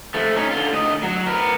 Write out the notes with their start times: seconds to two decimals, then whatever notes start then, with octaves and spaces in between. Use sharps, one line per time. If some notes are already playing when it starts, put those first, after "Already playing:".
0.14 F3 A3
0.37 C#4 D#4
0.50 D3 F4
0.73 D2 D#5
1.03 F#3
1.27 B3 A#4